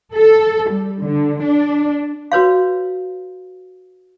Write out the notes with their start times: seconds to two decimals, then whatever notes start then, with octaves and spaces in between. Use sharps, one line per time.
0.14 A4
0.70 G3
1.02 D3
1.43 D4
2.32 F#4 B4 C#5 F5